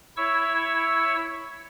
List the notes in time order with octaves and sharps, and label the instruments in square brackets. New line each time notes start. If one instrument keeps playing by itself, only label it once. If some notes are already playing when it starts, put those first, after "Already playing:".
[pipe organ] E4 C#5 C#6 E6